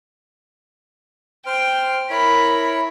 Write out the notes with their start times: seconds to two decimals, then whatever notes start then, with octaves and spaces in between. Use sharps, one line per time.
1.46 C5 G5 F6
2.10 E4 A#4 C#5 B5